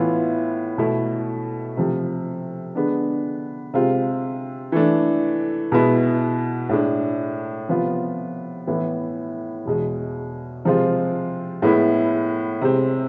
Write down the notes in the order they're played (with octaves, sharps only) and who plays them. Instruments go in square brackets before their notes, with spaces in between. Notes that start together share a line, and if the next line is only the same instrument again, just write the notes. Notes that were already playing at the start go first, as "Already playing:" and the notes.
Already playing: [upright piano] A2 E3 B3 F4
B2 A3 E4
C3 F3 A3
D3 G#3 B3 D4
C3 G#3 C4 F4
E3 A3 D4
B2 G#3 B3 E4
A2 G#3 D4
C3 F3 B3 F4
A2 E3 B3
E2 B2 G#3
C3 F3 G#3 C4 F4
A2 G#3 B3 E4
C3 G#3 C4